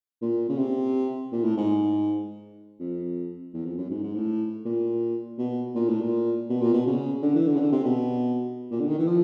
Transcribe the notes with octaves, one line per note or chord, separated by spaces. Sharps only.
A#2
C#3
C3
A#2
A2
G#2
F2
E2
F2
F#2
G#2
G#2
A2
A#2
B2
A#2
A2
A#2
B2
A#2
B2
C#3
D3
E3
D3
C#3
D3
C3
B2
A#2
D3
D#3
E3
F3